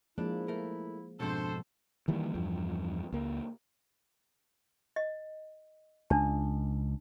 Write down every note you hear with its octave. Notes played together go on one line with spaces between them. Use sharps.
F3 G#3 A#3 D4 E4
A3 A#4
F2 G#2 B2 D4 A4 C5
D#3 E3 G3 A#3
E2 G2 F3
C#2 A#3
D#5
C#2 D4 A5